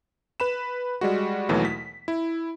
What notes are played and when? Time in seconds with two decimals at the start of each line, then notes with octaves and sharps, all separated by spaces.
0.40 B4 B5 E7
1.01 G3 G#3 F#4
1.49 D#2 B2 E3 F#3 A3
1.65 B6
2.08 E4